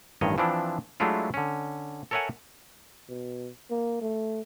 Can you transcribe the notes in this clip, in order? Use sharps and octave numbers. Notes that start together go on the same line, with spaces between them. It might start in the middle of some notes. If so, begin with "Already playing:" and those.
A1 G2 D#3 C#5 D#5
E3 F3 C4 D4 E4
F#3 G#3 A3 D4 E4 F4
D3 C#4
A4 A#4 C#5 E5 F#5 G#5
B2
A#3
A3